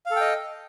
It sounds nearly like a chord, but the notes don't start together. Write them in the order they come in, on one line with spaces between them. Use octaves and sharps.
F5 A4 G5 D#5